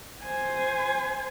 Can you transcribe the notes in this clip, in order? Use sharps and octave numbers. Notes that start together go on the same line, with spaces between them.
C5 G#5